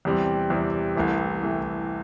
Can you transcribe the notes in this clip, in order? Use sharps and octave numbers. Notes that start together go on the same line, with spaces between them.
E2 C3 G3 C4
E2 C3 G3 C4
C2 C3 E3 A3
C3 E3 A3